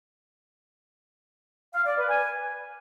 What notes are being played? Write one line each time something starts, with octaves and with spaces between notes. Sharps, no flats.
F5
D5
B4
G#5